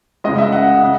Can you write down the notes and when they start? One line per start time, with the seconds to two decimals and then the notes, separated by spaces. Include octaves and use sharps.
0.24 C#2 C#3 G#3 D#5
0.38 E5
0.52 F#5
0.83 C#3